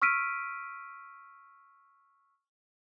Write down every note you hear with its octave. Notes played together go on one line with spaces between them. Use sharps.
C#6 E6 F6 B6 D7 D#7